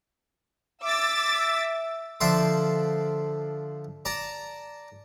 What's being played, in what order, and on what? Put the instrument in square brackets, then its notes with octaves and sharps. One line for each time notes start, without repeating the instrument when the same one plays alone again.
[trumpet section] E5 [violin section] D6 E6 A6
[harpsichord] D3 F3 D5 E5 C6
D5 A5 A#5